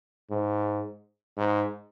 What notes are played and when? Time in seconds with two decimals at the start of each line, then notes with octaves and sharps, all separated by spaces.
0.31 G#2
1.37 G#2